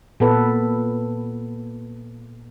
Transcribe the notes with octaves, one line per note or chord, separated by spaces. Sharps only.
A#2 B3 A4 B4